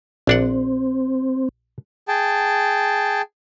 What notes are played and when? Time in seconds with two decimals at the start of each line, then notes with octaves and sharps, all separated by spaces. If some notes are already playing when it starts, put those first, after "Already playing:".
0.27 A#1 C4 D4 F#5
2.08 G#4 G5 A5